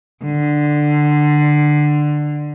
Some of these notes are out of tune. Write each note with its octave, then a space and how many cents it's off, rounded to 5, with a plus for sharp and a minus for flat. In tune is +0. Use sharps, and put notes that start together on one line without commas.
D3 +15